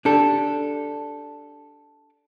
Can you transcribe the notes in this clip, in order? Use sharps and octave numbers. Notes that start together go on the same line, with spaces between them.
D4 G4 A4